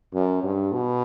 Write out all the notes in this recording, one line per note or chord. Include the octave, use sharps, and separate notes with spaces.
F#2
G2
B2